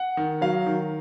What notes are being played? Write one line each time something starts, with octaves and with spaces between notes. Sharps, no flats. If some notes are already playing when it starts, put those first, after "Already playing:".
Already playing: F#5
D#3
F#3 F5
D#3